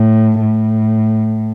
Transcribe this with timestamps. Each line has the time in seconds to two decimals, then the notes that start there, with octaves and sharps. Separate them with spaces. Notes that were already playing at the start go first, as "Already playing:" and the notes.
Already playing: A2
0.41 A2